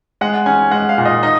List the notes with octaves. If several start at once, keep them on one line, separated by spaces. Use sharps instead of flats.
G#3 F#5
C#4 G#5
G#3 F#5
F5
A#2
D#5
D#4 D#5